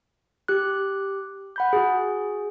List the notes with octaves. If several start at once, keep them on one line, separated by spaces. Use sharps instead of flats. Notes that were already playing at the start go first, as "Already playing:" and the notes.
G4 F#6
F#5 B5 G6
F#4 G#4